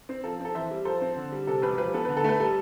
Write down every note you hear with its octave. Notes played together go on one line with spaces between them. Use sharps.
C4
F3 A4
C4 A4
E3 C5 E5
G3
F3 A4 C5
C4
D3
G3
C3 A4
E1 G4 B4
F3 G4 B4
B3 A4
D3 B4
A4
A3 B4
G3 A4